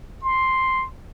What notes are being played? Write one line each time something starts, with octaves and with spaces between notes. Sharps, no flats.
C6